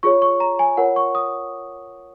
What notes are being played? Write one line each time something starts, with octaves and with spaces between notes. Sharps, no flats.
F4 G#4 C#5 C#6
C#6
A#5
G#5
F4 A#4 C#5 F#5
C#6
D#6